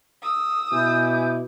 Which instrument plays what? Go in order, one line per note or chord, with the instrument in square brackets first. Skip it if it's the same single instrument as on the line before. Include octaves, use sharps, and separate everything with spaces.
[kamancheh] D#6 E6
[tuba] B2 [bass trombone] E4 [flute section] G#5 D6 G6